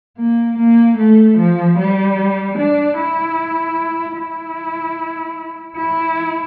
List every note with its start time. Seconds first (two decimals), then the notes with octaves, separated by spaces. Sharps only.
0.18 A#3
0.58 A#3
0.98 A3
1.37 F3
1.78 G3
2.58 D4
2.98 E4
4.17 E4
5.77 E4